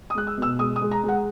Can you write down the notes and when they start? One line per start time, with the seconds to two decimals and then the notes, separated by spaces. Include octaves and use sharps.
0.10 D#6
0.15 G#3 F#6
0.27 E6
0.37 B2 E6
0.59 G#3 D#6
0.76 D#6
0.82 G#3
0.91 A#5
1.04 G#3 F#5